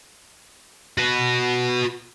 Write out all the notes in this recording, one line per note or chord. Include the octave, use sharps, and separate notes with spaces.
F#4 B4